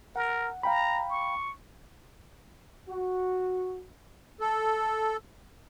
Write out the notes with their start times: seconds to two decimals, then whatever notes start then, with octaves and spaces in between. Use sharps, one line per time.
0.16 A#4 F#5
0.63 F5 G5 A#5 B5
1.09 C#6
2.89 F#4
4.40 A4